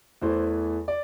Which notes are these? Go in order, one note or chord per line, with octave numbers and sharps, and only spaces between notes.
E2 E3 A3 C5
D5